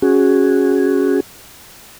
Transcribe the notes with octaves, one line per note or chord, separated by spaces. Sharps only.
C#4 F#4 G#4